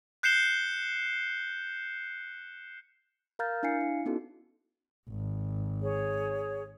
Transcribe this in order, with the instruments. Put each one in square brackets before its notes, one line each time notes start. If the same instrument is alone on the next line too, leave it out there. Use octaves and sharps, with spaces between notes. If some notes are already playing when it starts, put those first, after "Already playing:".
[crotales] F#6 G6 C7 C#7 E7 G7
[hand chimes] A#4 F5 A#5 F6 G6 A6
D4 E4 F5 G#5 C7 C#7
E4
B3 C#4 D#4 F#4 A4
[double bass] G#1
[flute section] G#4 C#5